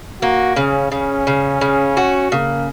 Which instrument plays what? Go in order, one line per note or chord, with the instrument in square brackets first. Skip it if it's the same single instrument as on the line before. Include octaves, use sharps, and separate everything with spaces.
[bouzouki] A#3 [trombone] F#4
[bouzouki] C#3 [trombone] C#4
[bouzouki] C#3 [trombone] C#4
[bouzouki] C#3
C#3
F#4
[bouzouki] C#3 [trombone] A#3